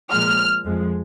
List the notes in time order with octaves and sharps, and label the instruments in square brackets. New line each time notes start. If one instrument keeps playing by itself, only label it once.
[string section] A#2 F3 G#3 F6
F2 F3 G#3